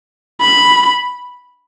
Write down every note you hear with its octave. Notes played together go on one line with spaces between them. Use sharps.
B5